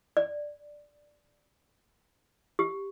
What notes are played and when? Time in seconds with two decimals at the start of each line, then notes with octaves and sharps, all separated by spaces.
0.17 D5
2.59 G4